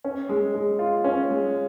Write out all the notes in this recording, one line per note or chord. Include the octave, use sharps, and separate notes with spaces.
C#4
G#3
G#3
F4
C#4
G#3